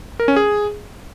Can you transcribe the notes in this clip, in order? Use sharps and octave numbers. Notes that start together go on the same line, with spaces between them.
A#4
C#4
G#4